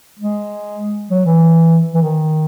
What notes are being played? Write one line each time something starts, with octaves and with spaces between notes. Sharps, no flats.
G#3
F#3
E3
E3
D#3